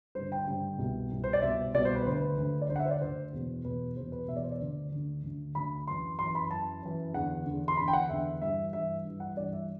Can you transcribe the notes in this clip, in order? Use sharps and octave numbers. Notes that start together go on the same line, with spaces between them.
G2 D3 C5
G5
G2 D3 G5
C2 B2
C2 B2
C5
D5
C2 B2 E5
C2 B2 D5
C5
B4
D2 D3 C5
B4
D2 D3
D5
D2 D3 C5
F#5
E5
C5
D5
D2 D3 C5
E2 B2
E2 B2 B4
E2 B2 C5
B4
E2 B2 E5
D5
C5
D5
D2 D3
D2 D3
D2 D3
D2 D3 B5
F#2 E3 C6
F#2 E3 C6
B5
F#2 E3 A5
F#2 E3
E2 D3 F#5
E2 D3
C6
E2 D3 B5
G5
F#5
E2 D3 E5
G2 E3 E5
G2 E3 E5
G2 E3
F#5
G2 E3 D5
E5